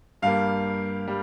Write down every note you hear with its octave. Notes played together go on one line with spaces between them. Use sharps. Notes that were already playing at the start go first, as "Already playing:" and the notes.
G2 G3 A#3 F5
G3